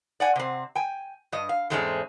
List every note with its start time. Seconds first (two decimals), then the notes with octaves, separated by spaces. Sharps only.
0.20 D5 F#5 G#5
0.36 C3 C4
0.75 G5 G#5
1.32 G2 D#5
1.49 F5
1.70 E2 G#2 G#3 A3 C4 C#4